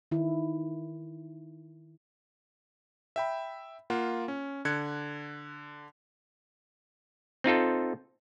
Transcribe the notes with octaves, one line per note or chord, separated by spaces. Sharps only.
D#3 E4
E5 G5 B5
A#3 F4 F#5
C#4
D3 F#6 G#6 C#7
C4 D#4 F4 A4